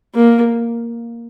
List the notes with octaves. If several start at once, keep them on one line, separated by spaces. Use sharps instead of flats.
A#3